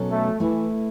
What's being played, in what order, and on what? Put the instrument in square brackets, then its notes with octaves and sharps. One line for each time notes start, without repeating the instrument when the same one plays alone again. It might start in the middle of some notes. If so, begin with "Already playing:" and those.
Already playing: [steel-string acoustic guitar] B2 F#3 C#4 A4
[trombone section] A3
[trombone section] E3 [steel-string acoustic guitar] A3 E4 B4